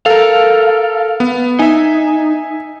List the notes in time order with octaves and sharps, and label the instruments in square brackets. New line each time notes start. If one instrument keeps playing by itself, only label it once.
[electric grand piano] A4 A#4 [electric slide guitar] F5
[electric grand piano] B3
[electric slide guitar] D#4 [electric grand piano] E5 G#5